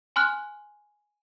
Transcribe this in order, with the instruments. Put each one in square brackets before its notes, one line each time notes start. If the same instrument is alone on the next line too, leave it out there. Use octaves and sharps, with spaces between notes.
[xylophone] G#5 C6 F6 F#6